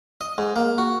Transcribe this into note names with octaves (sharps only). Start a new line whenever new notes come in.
D#5
G#2
A#3
F#4